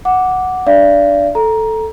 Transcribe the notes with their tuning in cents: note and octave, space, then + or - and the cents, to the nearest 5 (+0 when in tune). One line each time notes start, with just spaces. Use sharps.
F#5 +0 D6 -5
D4 +0 D5 -20 F5 -40
A4 +0 A#5 +10